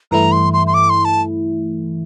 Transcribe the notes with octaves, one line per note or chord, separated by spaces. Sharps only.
G2 E3 A3 E4 A#5
C6
C6
C6
D6
C6
A5